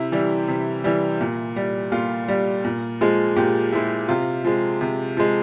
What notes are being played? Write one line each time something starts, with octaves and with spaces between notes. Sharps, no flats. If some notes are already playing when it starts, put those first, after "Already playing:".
Already playing: C3 E4
E3 G3
C3
E3 G3
A#2
G3
A#2 F4
G3
A#2
F3 G#3
A#2 G4
F3 G#3 E4
C3 F4
F3 G#3
C3
F3 G#3